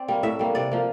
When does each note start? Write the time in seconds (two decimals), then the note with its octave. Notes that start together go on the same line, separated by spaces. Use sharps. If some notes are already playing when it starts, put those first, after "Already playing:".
Already playing: C4 D5
0.08 G3 A#3
0.23 A2 E5
0.39 G3 A#3
0.55 C3 D5
0.71 F3 A#3